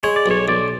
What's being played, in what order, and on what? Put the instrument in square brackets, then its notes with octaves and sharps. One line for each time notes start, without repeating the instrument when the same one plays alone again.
[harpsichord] G#3 [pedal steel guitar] C#5
[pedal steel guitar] D5
[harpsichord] B1 [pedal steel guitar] C#5
[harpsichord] B1 [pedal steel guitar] D5